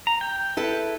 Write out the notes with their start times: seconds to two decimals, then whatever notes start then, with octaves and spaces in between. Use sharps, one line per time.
0.07 A#5
0.21 G5
0.57 E4 A4 B4